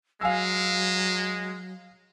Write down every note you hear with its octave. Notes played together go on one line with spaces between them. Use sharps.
F#3 G#3 F5 G#5 E6